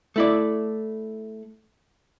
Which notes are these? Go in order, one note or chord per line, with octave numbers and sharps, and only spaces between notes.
A3 E4 D5